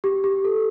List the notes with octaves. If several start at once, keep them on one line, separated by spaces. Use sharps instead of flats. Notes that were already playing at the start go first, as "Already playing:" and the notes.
G4
G4
A4